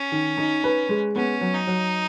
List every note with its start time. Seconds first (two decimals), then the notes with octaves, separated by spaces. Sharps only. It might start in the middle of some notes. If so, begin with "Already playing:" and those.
Already playing: C#4
0.12 D#3
0.37 D#4
0.64 B4
0.89 G#3
1.16 B3 C#4
1.41 F#3
1.54 D#4
1.67 F#3